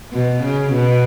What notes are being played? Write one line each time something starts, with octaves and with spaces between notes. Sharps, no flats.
B2
C#3
B2